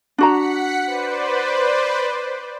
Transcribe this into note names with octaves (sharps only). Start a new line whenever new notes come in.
D4 F#4 F#5 A#5 B6 C#7
B4 C5 D5